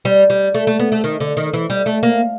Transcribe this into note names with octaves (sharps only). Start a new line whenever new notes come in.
G3
G3
A3
A3
B3
A3
D#3
D3
D#3
E3
G3
A3
A#3